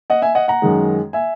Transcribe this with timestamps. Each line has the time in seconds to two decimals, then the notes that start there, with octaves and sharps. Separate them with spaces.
0.10 D#5 F#5
0.22 E5 G#5
0.35 D#5 F#5
0.48 F#5 A#5
0.62 F#2 D#3 G#3
1.13 E5 G#5